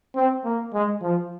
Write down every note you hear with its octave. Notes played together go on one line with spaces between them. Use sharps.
C4
A#3
G#3
F3